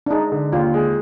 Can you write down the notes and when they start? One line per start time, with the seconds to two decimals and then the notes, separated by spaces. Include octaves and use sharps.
0.06 D4
0.10 G#3 D#4
0.32 D3
0.52 D#2 F4
0.74 G#3